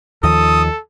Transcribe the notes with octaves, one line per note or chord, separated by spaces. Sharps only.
D#2 D#3 F3 A4 D#6